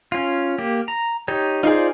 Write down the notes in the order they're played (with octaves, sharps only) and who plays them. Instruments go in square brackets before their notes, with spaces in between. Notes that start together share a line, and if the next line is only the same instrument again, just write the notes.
[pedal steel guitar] C#4 F4
A#3 G4
A#5
D#4 G4 C#5
[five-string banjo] D#4 G#4 [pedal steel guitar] F4 C5 D5